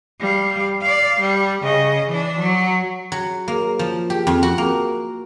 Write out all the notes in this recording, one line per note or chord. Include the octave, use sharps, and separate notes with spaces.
G3 F5
D5 F5
G3
C#3 D#5
E3 D4
F#3
F#3
A#3
F3
G4
F2
F#4
A#3